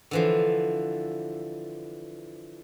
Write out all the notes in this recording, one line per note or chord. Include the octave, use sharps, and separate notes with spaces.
D3 E3 F3